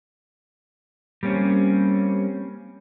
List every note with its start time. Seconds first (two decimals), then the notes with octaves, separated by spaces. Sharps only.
1.23 G3 A#3 C4 C#4